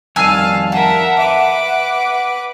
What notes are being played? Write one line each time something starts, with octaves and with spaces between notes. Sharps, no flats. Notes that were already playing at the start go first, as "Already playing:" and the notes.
F2 D#3 G3 F5 G#5 A5 E6 F6
A#4 E5 F#5 A5
B4 E5 D6